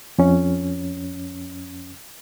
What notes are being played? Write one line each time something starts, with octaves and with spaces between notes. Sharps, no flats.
F2 C#4